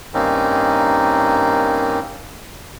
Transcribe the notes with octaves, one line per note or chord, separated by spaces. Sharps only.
G2 D#3 A#3 C4 C#4 D#4